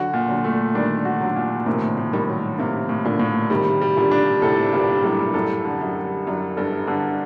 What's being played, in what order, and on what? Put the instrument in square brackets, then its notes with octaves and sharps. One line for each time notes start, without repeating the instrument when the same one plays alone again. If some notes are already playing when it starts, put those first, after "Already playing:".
Already playing: [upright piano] D3 F#3 [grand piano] F#4
[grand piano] A#2
[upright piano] D3 F#3
[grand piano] A3
[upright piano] D#3 G3 [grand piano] D4
[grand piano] F#4
[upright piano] D3 F#3
[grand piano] A#2
[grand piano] A2 [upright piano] C3 D#3
[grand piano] A2
[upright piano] D#3 G3
[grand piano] F#3
[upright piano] C3 D#3 [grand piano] A#3
[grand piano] A2
[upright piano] A#2 D3
[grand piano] A2
[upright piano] C3 D#3 [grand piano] G3
[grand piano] G3
[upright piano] A#2 D3
[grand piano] D4
[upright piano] A2 C3 [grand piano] A4
[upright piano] G2 A#2 [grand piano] G3
[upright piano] F#2 A2 [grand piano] G3
[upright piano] F#2 A2 [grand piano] A4
[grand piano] D3
[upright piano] F#2
[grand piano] G3
[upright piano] F#2 [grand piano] D4
[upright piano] G2 [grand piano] A4
[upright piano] G2 [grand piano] D3